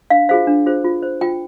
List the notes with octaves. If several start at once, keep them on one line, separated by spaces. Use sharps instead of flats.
D4 F5
F4 G#4 C5 F5
D4
F4 G#4 C5
F4
C5
F4 G5